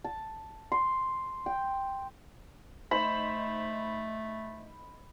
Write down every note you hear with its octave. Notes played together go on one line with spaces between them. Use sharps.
A5
C6
G5
A3 D#4 C5 B5